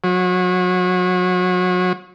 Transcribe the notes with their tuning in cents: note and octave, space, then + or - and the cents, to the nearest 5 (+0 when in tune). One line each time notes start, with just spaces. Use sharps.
F#3 -30